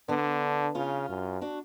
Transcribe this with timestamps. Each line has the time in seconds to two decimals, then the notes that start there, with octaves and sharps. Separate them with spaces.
0.08 D3 B3 D4
0.75 C#3 C#4 F4
1.09 F#2
1.41 D4 F#4